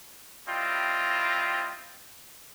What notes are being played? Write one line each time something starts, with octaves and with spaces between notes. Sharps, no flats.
G3 C4 E4 F4 D#5 G5